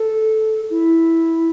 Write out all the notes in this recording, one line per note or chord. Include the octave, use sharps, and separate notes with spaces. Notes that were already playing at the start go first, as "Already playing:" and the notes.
Already playing: A4
E4